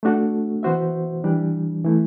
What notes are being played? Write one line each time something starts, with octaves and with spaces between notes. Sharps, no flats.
A3 D4 F#4 A4
E3 B3 F#4 C5 E5
E3 G3 D4
E3 A3 E4